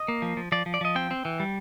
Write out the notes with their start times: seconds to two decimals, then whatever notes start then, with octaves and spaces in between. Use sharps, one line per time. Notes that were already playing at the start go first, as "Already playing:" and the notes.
Already playing: D#5
0.08 A#3
0.22 F3
0.37 F3
0.52 F3 D5
0.66 F3
0.74 D5
0.81 F3 D#5
0.95 C4 G5
1.11 C4
1.25 E3
1.40 G3